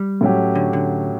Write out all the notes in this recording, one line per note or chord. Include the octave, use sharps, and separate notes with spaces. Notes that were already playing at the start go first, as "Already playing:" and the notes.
Already playing: G3
A2 F#3 C#4 G4
D3
D3